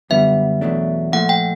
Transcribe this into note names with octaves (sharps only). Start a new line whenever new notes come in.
F#2 D3 G3 B3 E5
E2 B2 F#3 A3 D4
A#2 F3 A3 F#5
G5